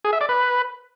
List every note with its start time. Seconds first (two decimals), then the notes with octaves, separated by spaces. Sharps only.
0.05 G#4
0.13 E5
0.21 D5
0.29 B4